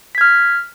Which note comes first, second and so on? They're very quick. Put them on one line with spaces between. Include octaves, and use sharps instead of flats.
B6 G#6 F6